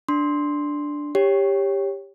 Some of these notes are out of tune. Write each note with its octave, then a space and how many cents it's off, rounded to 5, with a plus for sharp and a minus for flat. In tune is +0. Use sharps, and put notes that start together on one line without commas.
D4 +0 C6 +0
G4 +15 C#5 +0